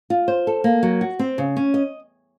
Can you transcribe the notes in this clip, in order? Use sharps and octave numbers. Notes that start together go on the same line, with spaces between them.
F4
C5
A4
A#3
F#3
F#4
C4
C#3
C#4
D#5